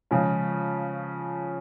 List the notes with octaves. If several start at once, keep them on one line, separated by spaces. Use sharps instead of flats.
C#3 F3 G#3 C#4